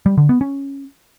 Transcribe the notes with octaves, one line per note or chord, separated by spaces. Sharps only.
G3
D3
B3
C#4